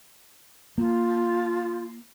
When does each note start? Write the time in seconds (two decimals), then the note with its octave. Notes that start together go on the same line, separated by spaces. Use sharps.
0.78 A#3 F4